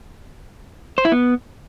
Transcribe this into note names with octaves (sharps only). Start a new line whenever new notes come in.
C5
E4
B3